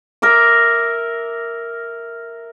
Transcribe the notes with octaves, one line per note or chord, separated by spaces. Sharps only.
A#4 E5 D6